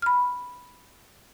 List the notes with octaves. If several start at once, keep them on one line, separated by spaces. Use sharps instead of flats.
B5 F6